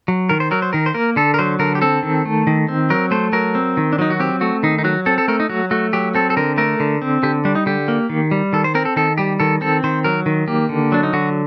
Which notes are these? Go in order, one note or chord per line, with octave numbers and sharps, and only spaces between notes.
F#3
D#3 A#4
C5
F#3 A#4
C5
D#3 A#4
C5
A#3 A#4
D3 A4
A#4
F#3 C5
D3 A#4
G4
C4 A4
D#3
A3
D#3
C4
F#3 A#4
A3 C5
F#3 A#4
C4
D#3
D4
F#3 D#4
F#4
C4 G4
A3 F#4
D#3 D#4
D#4
F#3 F#4
C4 A4
A4
A3 A#4
D#4
F#3 F#4
A3 F#4
F#3 G4
C4 A4
A4
D3 A#4
A3 A#4
D3
C4
D3 G4
G3 D4
D#4
D3 G4
A#3
D#3
G3
D#3 A4
C5
C4 A#4
A4
D#3 A4
G3 G4
D#3 A4
C4 A4
D#3 C5
F#3 A#4
D#3
A#3 G4
D3
F#3 D4
D#4
D3 F#4